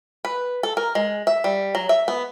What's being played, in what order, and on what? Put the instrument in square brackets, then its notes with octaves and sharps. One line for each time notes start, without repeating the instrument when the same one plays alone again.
[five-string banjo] B4
A4
A#4
G#3
E5
G3
F#3
E5
B3